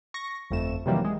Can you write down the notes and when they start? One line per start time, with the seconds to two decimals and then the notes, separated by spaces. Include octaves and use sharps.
0.14 C#6 A#6
0.51 G1 F2 A3 E7
0.86 C3 D#3 E3 F#3 G3 A#3
1.05 G#3